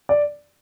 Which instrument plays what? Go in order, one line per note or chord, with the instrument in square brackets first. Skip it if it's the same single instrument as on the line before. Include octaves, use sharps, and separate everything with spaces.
[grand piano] D5